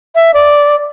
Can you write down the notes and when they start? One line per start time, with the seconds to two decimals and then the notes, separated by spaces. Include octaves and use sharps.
0.15 E5
0.34 D5